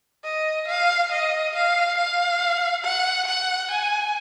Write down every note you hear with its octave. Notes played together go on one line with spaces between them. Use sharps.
D#5
F5
D#5
F5
F5
F#5
F#5
G#5